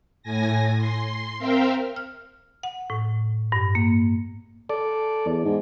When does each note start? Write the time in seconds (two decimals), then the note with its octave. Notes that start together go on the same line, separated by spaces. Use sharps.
0.22 A2 G#5 A#6
0.77 C6
1.38 C4 A#4 E5 F5 G5
1.96 F6
2.63 F#5
2.90 A2
3.52 G2
3.75 A#3
4.69 A4 D5
5.26 E2
5.45 G#2